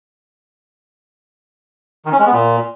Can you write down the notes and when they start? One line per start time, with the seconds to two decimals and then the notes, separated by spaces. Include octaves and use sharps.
2.05 D#3
2.12 C#4
2.19 G#3
2.26 B3
2.33 A#2